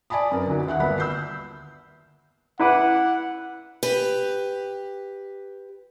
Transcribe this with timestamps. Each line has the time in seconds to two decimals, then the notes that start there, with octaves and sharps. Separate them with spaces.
0.10 D5 G#5 A5 B5 D#6
0.31 F#2 A#4 B4
0.47 D2 D#4 F#4
0.67 D#2 E5 F#5 F#6
0.80 G1 D2 A#3 B3 B5
0.98 E6 G6 C7
2.59 E4 B4 F#5 D6
3.83 G4 B4